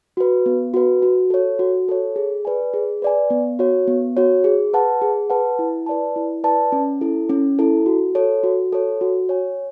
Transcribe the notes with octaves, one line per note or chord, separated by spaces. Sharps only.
F#4 B4
B3
F#4 B4
F#4
A4 C#5
F#4
A4 C#5
G#4
B4 D5 G#5
G#4
B4 D5 G#5
B3
F#4 C#5
B3
F#4 C#5
G#4
B4 F#5 A5
G#4
B4 F#5 A5
E4
B4 D5 A5
E4
B4 D5 A5
C#4
E4 A4
C#4
E4 A4
F#4
A4 C#5
F#4
A4 C#5
F#4
C#5 G#5